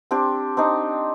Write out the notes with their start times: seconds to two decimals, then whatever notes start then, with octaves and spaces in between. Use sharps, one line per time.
0.11 C4 D4 G4
0.57 C4 D4 D#4